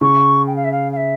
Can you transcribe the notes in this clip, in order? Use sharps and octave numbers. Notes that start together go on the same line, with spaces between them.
C#3 C#6
G5
F5
E5
F5
F5
E5